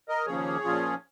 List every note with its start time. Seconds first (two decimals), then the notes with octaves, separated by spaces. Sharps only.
0.09 A#4 D#5
0.26 D#2 C#3 F3 A#3 C#4 G#4 C#5
0.64 A#2 F3 C#4 F4